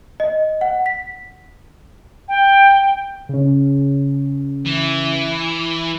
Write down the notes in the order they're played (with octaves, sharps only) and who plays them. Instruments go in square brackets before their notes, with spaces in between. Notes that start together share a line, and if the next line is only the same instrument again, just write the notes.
[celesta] D#5
F#5
B6
[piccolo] G5
[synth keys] C#3 C#4
[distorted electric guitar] E3